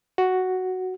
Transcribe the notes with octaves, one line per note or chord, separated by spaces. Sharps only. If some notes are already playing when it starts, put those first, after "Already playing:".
F#4